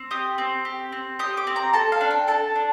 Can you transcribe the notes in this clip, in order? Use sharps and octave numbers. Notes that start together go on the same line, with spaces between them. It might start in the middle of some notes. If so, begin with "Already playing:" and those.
Already playing: C4
G4 D#6
C4
G4
C4
G4 D#6
D6
C4
A#5
A4 A5
F5
D4
G5
A4 A5
D4